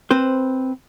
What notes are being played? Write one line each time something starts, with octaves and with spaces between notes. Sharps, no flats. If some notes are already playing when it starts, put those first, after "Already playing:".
C4 B4 C5